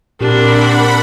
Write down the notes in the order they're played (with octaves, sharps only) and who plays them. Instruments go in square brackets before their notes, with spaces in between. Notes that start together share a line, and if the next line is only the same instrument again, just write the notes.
[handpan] A#2 G4 [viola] C4 D4 [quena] A#4 [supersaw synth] F#5 B5